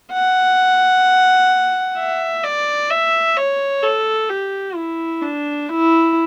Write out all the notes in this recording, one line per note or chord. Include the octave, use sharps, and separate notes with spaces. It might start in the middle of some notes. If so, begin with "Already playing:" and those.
F#5
E5
D5
E5
C#5
A4
G4
E4
D4
E4